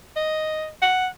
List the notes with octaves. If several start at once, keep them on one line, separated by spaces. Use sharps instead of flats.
D#5
F#5